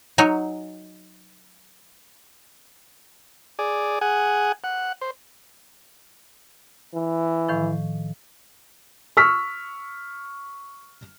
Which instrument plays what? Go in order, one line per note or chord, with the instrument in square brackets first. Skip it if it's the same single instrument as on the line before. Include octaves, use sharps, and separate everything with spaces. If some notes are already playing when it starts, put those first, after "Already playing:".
[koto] F#3 D#4 C#5 G#5
[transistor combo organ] G#4 D5
G#4 F#5 G#5
F#5
C5
[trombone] E3
[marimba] A2 D#3 F3
[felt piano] C#6 E6 F6 B6